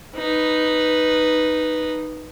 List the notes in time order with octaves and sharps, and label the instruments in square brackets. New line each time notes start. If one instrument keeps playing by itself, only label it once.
[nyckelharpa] D#4 B4